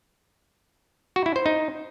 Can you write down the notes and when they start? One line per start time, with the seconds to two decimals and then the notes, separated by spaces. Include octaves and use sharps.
1.16 F#4
1.26 E4
1.36 C5
1.46 D#4